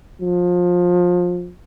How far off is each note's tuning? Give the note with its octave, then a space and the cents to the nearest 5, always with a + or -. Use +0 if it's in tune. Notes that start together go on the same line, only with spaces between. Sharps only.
F3 +25